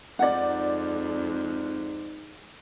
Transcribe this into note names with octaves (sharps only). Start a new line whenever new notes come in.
F2 G#2 D#4 D5 F#5